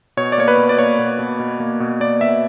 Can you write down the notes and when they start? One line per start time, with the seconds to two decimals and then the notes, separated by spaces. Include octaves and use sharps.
0.17 B2 C#5
0.32 D5
0.38 A#3 C#5
0.48 B4
0.57 B2
0.69 D5
0.78 A#3 C#5
0.99 B2
1.19 B2
1.40 B2
1.60 A#3
1.80 B2
2.00 A#3 D5
2.21 B2 E5